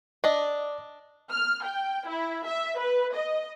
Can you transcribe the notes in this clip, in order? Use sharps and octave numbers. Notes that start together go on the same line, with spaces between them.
D4 D5 D#5
F6
G5
E4
E5
B4
D#5